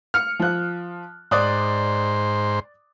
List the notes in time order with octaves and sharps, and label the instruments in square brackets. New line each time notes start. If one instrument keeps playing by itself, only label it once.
[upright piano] F6 C#7
F3 F#6
[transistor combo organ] G#2 C5 [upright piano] D5 D#6 F#6